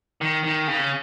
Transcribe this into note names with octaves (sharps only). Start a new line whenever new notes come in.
D#3
D#3
C#3